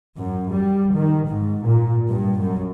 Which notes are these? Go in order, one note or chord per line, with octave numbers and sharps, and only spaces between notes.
F#2
G3
D#3
G#2
A#2
G2
F#2